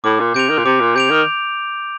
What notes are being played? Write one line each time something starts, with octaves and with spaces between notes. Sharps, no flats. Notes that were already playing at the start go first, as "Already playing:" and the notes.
A2 D6
A#2
C3 G6 D7 F7
D#3
A#2
C3 D6
A#2
C3 G6 D7 F7
D#3